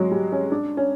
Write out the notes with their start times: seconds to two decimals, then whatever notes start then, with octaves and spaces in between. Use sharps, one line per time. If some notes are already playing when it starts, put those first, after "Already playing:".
Already playing: F#3 G#3
0.12 G3
0.32 C#4
0.52 D4
0.77 C#4